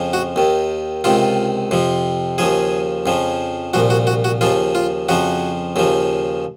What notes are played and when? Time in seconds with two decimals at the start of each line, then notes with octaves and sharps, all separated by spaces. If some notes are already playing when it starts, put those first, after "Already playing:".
Already playing: F2 C#3 F3
0.13 F#4
0.36 D#2 D#3
1.04 C#2 C3 D#3 F4
1.71 F2 C3 F3
2.38 D#2 C#3 F3 G#4
3.06 F2 C#3 F3
3.74 C2 A#2 F3 F#4
3.90 F#4
4.07 F#4
4.24 F#4
4.41 D#2 C#3 F3 F4
4.75 F4
5.09 F2 C#3 F3 F#4
5.76 D#2 C#3 F3